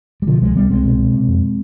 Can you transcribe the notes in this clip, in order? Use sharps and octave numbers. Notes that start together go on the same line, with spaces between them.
G3
B2 D3 F3
C2 F3 G#3
C2 G3 B3
C2 G#3 C4
B2
B2
C3
F2